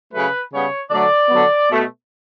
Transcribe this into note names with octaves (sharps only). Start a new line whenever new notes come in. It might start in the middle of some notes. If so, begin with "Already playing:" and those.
C#3 F#3 A3 B4
C#3 G3 B3 C#5
D3 F#3 A3 D5
D3 F#3 B3
B2 A3